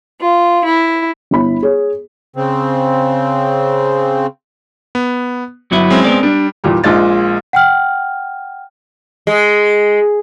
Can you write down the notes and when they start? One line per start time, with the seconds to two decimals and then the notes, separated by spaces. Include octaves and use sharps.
0.21 F4
0.65 E4
1.31 G1 E4 B5
1.63 G#4 C#5
2.36 C#3 C4
4.95 B3
5.71 G1 F#3 B3 E4
5.90 G#3 C4 C#4
6.04 B3 A#4 D5
6.23 G3 D4
6.64 E2 A#2 G3
6.84 A#1 A#2 G#3 A6
7.53 F#5 G5 F6
9.27 G#3